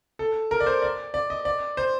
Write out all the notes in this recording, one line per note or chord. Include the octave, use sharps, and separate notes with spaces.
A4
A#4
D5
C5
D5
D5
D#5
D5
C5